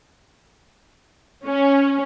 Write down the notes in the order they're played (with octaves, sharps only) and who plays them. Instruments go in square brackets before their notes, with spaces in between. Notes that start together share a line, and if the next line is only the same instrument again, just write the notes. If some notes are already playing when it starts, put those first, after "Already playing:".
[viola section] C#4